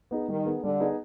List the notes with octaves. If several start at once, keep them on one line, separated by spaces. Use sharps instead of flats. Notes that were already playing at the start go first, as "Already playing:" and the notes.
B3 D#4 G#4
D#3 G3
B3 D#4 G#4
D3 G3
B3 D#4 G#4